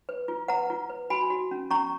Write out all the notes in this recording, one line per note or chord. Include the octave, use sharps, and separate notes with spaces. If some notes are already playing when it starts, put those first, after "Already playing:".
B4
F4
B4 F#5 A#5
F4
B4
F#4 G#5 B5
F#4
C#4
C#4 A#5 C#6